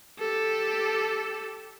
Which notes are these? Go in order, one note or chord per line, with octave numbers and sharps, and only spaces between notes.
G4 A4